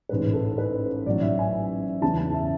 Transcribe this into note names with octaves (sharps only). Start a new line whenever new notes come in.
A1 G#2 G#3 B4
A4
B4
A1 G#2 F#3 D5
E5
G#5
E2 C#3 E3 A5
A5
E5